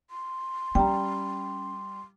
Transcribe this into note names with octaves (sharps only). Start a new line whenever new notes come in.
C6
G3 C#4 G5 A#5